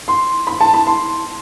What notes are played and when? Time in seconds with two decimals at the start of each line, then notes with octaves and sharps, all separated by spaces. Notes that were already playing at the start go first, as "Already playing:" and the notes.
0.08 C6
0.47 B5
0.61 A5
0.74 B5
0.87 C6